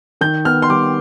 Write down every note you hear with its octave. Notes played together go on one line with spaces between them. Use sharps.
D#3 G6
B3 F6
C6
G3 D6